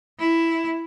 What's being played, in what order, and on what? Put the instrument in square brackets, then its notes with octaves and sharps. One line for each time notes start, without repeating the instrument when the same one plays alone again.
[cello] E4